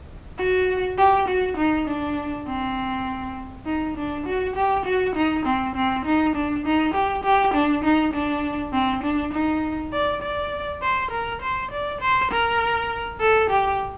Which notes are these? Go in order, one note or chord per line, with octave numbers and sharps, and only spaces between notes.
F#4
G4
F#4
D#4
D4
C4
D#4
D4
F#4
G4
F#4
D#4
C4
C4
D#4
D4
D#4
G4
G4
D4
D#4
D4
C4
D4
D#4
D5
D5
C5
A#4
C5
D5
C5
A#4
A4
G4